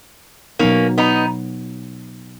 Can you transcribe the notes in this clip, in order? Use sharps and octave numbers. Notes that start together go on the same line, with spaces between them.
B2 F#3 A#3 B3 C#4 D#4
B3 D#4